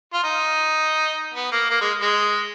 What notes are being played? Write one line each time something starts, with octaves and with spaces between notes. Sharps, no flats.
F4
D#4
B3
A#3
A#3
G#3
G#3